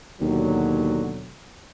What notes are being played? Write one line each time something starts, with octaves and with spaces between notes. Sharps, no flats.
D#2 B2 D3 F#3